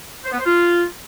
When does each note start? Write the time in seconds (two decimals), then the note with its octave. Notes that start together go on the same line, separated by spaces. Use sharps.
0.24 C5
0.31 B3
0.38 C5
0.45 F4